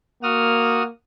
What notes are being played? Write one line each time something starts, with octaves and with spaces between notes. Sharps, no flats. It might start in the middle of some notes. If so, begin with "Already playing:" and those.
A#3 F#4 D#6 F6